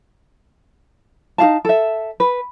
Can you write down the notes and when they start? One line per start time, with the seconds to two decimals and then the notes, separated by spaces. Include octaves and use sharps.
1.38 D#4 G#4 F5 A5
1.65 A4 E5
2.20 B4